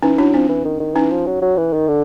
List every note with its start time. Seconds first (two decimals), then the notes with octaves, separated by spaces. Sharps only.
0.03 E3 C#4 D#4
0.18 F#3 D4 E4
0.34 F3 C4 D4
0.49 E3
0.64 D#3
0.80 D#3
0.95 E3 C#4 D#4
1.11 F3
1.26 F#3
1.42 F#3
1.57 E3
1.73 D#3
1.88 D3